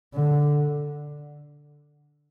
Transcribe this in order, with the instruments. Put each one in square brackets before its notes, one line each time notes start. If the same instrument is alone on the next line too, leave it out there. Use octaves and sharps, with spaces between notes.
[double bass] D3